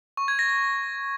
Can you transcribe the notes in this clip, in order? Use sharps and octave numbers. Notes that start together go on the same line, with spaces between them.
C#6
G#6
A#6
A#6